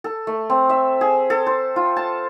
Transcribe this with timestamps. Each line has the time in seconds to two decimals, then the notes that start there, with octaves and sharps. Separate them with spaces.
0.04 A4
0.27 A3
0.50 C4
0.70 E5
1.01 G#4
1.30 A4
1.47 C5
1.76 F4
1.96 A5